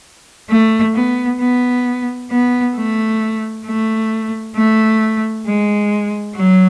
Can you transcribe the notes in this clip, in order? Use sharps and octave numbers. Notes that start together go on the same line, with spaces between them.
A3
B3
B3
B3
A3
A3
A3
G#3
F#3